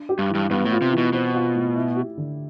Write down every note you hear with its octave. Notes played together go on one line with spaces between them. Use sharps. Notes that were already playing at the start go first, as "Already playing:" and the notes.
Already playing: D4
G4
G2
E3
G2
G2 B3
A2
F4
C3
E3
B2
B2 C4
F4
A2
E4
G4
D3